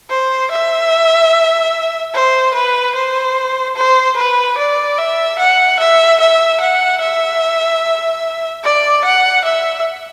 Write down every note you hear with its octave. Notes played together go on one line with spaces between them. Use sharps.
C5
E5
C5
B4
C5
C5
B4
D5
E5
F#5
E5
E5
F#5
E5
D5
F#5
E5